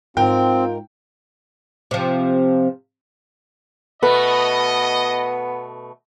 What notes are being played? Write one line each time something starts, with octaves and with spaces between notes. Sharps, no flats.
G#2 C4 F4 A#4 G5
C3 F3
B2 A3 B3 B4 D#5